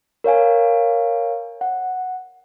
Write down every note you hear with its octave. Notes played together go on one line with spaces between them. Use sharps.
A#4 C#5 F5 G#5
F#5